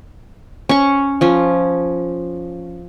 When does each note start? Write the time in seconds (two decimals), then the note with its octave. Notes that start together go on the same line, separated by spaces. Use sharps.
0.69 C#4 C#6
1.21 F3 C#4